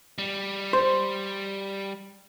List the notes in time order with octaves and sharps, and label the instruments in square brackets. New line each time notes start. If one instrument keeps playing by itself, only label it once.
[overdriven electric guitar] G3
[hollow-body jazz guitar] C5